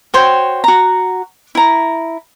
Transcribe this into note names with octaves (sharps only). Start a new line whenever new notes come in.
F#4 C5 C#5 G5
F#4 A#5
E4 A#5